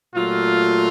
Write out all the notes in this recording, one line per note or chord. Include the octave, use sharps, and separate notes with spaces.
A#2 F#3 A3 F4